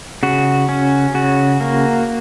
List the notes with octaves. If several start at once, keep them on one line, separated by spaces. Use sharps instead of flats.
C#3 F#4
C#4
C#3 F#4
A#3